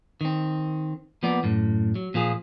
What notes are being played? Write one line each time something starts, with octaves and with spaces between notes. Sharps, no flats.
D#3 C4
F3 A#3 B3 D5
F#2 A2
F#3
A#2 F3 A#3 G#4